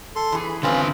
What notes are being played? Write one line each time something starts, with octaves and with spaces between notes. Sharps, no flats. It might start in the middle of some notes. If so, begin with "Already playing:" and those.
A4 C6
E3 G#4
B5
E2 G#2 D3 C4 C#4 F4 B4